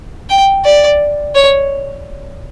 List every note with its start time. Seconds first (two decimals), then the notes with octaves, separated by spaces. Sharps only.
0.29 G5
0.65 D5
1.35 C#5